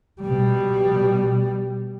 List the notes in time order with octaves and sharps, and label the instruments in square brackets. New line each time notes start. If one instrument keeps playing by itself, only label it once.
[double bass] B2 G3